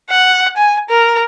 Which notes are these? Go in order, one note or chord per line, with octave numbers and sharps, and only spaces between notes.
F#5
G#5
A#4